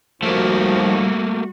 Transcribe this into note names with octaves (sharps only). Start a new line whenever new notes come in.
D#2 D#3 F3 G3 A3 A#3 F#4